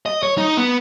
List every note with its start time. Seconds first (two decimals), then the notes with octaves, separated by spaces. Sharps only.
0.06 D#5
0.23 C#5
0.38 D#4
0.57 B3